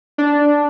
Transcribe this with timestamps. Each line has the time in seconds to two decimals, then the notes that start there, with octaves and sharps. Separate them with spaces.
0.18 D4